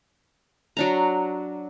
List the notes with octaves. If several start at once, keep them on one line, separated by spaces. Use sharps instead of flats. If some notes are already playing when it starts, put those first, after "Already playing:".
F#3 D4 A#5